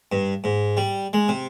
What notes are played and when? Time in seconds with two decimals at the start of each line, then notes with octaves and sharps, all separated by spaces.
0.12 G2
0.44 G#2
0.77 G3
1.13 G#3
1.28 C3